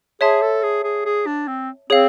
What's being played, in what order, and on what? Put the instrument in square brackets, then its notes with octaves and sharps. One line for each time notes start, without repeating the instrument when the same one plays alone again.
[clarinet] G#4 [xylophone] C#5 E5 A5 C6
[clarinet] A4
G#4
G#4
G#4
D4
C4
[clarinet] C4 [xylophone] G#4 C#5 F5